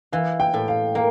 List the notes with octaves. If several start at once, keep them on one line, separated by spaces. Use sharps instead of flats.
E3 F5
G5
A2
F5
A#3 F5